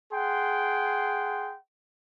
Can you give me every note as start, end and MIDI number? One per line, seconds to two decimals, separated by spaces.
0.12 1.56 68
0.12 1.56 78
0.12 1.56 79
0.12 1.56 84